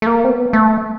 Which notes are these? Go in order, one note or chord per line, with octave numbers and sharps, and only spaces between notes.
A3
A#3
C4
B3
A3